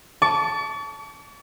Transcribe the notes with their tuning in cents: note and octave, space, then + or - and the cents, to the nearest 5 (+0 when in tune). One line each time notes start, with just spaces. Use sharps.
A5 -5 C#6 +45